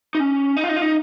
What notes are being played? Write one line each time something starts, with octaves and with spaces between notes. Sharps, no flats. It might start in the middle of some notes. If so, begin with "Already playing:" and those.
D#4
C#4
D#4
F4
D#4
F4
D#4